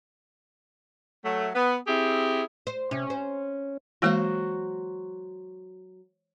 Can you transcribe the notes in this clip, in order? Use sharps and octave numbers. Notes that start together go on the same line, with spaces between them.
F#3 A3
B3
C4 E4 G4 G#4
C5
C3 C#4
C5
E3 F#3 G#3 A#3 F#4 C5